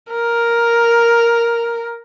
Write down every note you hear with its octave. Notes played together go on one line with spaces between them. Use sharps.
A#4